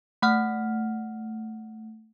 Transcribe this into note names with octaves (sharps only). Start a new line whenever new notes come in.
A3 F#5 F6